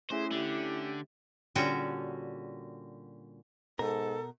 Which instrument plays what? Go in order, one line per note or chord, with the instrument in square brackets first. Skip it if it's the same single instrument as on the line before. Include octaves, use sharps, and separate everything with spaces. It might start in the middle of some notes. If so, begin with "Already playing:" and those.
[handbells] A3 C#4 E5 [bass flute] E4 [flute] G#4 [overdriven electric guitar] C5
[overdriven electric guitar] D3 [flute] G4
[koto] A#2 D3 G3 C#4 F#4 G5
[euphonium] G#2 [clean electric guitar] B2 A#4 [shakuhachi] A4